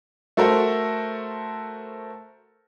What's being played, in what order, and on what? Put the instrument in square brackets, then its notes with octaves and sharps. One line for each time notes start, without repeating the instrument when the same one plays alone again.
[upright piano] A3 F#4 A4 A#4 C5